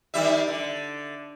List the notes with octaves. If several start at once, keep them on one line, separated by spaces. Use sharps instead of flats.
D#3 G3 E5
D3